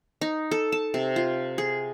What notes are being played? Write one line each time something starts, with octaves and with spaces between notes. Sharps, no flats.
D#4
A4
A5
C3
F4
G#4